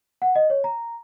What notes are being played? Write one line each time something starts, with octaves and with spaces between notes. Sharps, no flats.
F#5
D#5
C#5
A#5